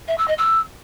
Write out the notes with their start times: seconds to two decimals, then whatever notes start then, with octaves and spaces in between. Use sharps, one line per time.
0.07 E5
0.17 E6
0.27 D#5
0.37 E6